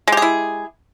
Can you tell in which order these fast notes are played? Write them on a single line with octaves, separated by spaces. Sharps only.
G#3 G4 G#4 E4